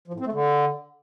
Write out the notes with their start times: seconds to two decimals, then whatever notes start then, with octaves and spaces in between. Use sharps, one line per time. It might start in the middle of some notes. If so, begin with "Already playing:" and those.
0.08 F3
0.14 A2
0.20 C4
0.26 A3
0.32 D3